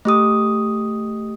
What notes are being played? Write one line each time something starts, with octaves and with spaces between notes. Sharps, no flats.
A3 G4 D#6